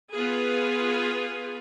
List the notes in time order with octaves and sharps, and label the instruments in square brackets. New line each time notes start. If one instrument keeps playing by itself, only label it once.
[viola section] B3 F4 G#4 B4